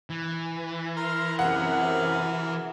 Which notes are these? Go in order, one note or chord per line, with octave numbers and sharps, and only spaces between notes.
E3
A#4 A#5 C6 F6
F#2 C3 G#4 A#4 F#5